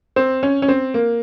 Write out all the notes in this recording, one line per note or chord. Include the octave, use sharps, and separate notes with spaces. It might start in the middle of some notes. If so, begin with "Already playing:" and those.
C4
C#4
C#4
C4
A#3